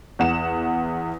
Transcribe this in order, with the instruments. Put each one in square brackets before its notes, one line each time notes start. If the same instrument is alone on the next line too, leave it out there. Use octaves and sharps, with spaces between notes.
[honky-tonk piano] E2 F#5 E7